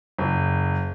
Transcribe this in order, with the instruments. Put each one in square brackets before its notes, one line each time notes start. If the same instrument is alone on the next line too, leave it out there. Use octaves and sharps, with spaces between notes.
[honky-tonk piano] F#1